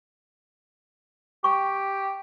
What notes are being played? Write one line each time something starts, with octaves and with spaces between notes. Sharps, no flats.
G4 C#6